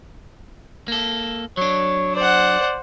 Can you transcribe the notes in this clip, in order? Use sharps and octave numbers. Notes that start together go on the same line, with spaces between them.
A#3 A4
F#3 D4 C#5
C5 D5 F#5